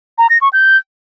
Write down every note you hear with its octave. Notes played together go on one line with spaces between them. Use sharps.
A#5
A#6
C#6
G6